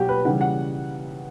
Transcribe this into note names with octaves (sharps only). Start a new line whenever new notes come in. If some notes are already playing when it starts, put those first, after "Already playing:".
Already playing: B2 F#3 F#4 G4
B4
C#3 E3 G3 F#5
F#5